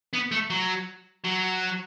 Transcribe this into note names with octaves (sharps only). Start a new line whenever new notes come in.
B3
A3
F#3
F#3